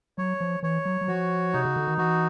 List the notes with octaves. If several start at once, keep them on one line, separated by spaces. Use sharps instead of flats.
F#3 C#5
F3
E3 C#5
F#3
F#3
F3 F#4
C3 D#4
C#3
D3
D#3
E3 F#4